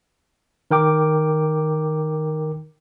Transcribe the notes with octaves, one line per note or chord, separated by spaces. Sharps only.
D#3 A#4 G5 D6